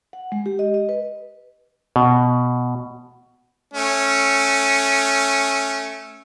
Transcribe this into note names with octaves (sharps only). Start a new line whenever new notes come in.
F#5
G#3
G4
D#5
D#5
B4
B2
A3 C#4